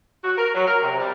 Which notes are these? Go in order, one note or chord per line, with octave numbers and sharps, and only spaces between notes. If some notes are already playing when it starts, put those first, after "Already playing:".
F#4
A#4
F#3
A#4
C3
G3